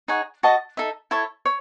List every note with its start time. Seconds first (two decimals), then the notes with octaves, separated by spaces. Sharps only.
0.08 D#4 G#4 C#5 F#5
0.43 F#4 A4 D#5 A5
0.77 D#4 A4 E5
1.11 E4 A4 C#5
1.46 C#5